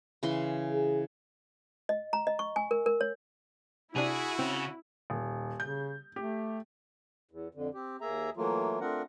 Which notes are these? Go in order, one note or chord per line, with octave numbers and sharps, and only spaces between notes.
C#3 E3 C6
G#4
D#5
A#5
D#5
C#6
G#5
A#4
A#4
C#5
C3 D4 E4 F#4 G#4
C#3 C4
D#1
C#3 G6
A3 G4
E2
F2 D3
C4 G4
D#2 A#3 G#4 E5 A#5
E3 F#3 A3 A#3 F4
A3 C4 D4 F4 A#4 F#5